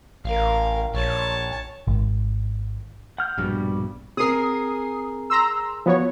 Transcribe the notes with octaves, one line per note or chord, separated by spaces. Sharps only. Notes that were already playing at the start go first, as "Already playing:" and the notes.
A1 A#4 F5
A#1 C#5 A5
G#1
F#5 F6 G6
A#1 G2 B2 G3
C4 G#4 A#4 D#6 C7
A#5 C6 E6
F3 B3 F#4 C#5